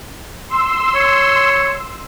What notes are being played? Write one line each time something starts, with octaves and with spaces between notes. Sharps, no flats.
C6 E6
C#5